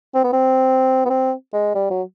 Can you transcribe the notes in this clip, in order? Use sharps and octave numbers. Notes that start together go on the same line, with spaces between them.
C4
B3
C4
B3
C4
G#3
G3
F#3